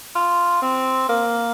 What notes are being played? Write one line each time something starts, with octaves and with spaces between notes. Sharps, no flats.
F4
C4
A#3